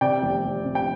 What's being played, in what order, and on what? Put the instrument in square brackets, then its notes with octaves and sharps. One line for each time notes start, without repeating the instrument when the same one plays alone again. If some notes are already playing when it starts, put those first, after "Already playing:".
[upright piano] C3 D5 G5
F1
F1
C3
G5